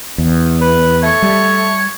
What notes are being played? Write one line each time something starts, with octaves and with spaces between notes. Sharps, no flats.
E2
B4
A3 C#5
G3